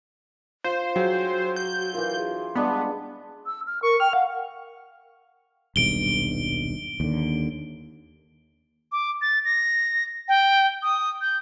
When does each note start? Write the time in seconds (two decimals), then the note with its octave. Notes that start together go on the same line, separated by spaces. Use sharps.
0.64 F4 C5
0.96 F#3 F#4 G#4 G5 G#5
1.56 G6
1.94 E3 F4 A#4
2.17 G#4
2.56 G3 G#3 B3 D4
3.46 E6
3.67 F6
3.83 A#4 C#6
4.00 G5 F6
4.13 F5 F#5
5.76 D#1 B1 G2 D7 G7
7.00 D#2 D3
8.92 D6
9.22 A6
9.45 A#6
10.28 G5
10.83 D#6
11.21 G6